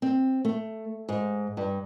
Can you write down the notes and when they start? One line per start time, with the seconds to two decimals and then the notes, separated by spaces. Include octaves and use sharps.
0.02 C4
0.45 A3
1.09 G#2
1.57 G2